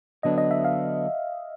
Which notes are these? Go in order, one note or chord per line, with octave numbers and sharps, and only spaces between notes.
D3 F#3 B3 D4 D#5
D#5
E5
F5